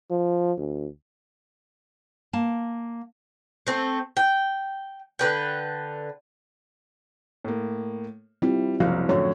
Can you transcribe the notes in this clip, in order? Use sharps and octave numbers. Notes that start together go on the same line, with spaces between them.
F3
D2
A#3 A5
A3 C4
G5
D3 B4 G5
A2 A#3
G3 C4 E4 F4
F#1 C2 F3 F#3 F5
F#2 A2 D3 C#5